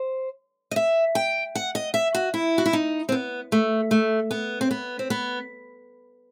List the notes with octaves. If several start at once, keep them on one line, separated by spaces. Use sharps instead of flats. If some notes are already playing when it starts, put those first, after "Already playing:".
Already playing: C5
D#5
E5
G5
F#5
D#5
E5
F#4
E4
F#4
E4
D#4
C4
B3
A3
A3
B3
C4
B3
C4
B3